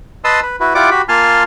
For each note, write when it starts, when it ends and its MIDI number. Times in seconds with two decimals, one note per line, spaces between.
0.24 0.40 71
0.24 0.40 75
0.24 0.40 81
0.24 0.40 84
0.24 0.40 87
0.24 0.40 88
0.42 0.56 71
0.60 0.74 64
0.60 0.74 66
0.60 0.74 71
0.75 0.90 64
0.75 0.90 65
0.75 0.90 67
0.75 0.90 74
0.75 0.90 78
0.75 0.90 86
0.91 1.02 66
0.91 1.02 67
0.91 1.02 83
1.09 1.43 58
1.09 1.43 65
1.09 1.43 80
1.09 1.43 81
1.09 1.43 84
1.09 1.43 89